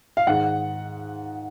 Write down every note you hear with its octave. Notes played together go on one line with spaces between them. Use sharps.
F5
G#2 D#3 G#3 F#5